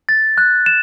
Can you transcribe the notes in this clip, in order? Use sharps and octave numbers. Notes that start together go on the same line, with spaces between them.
A6
F#6
E7